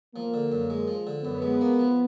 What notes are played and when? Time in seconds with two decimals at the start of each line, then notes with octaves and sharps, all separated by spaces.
0.15 F3 A#3
0.34 D3
0.52 F#2
0.70 G#3
0.88 F3
1.07 D3
1.24 F#2 B3
1.42 G#3
1.61 A#3
1.79 F3